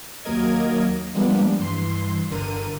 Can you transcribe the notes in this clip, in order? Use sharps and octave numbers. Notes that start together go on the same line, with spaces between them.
D#2 F#3 A#3 A#4 D#5 G#6
F3 G3 G#3 A#3 B3 D4
G2 E3 C6
G1 D3 A#4 D#7